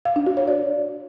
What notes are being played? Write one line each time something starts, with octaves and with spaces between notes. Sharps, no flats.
F5
D4
F#4
C#5
D5